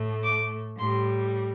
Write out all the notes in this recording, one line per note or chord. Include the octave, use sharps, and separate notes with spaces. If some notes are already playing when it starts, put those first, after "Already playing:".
Already playing: A2 A3
D6
A2 G3 C6